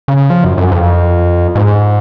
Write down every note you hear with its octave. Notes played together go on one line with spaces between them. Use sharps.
C#3
F3
F#2
F#2
F2
G#2